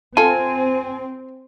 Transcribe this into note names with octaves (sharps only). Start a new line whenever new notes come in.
C4 F4 A4 G#5